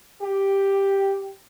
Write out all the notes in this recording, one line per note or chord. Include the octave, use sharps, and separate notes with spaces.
G4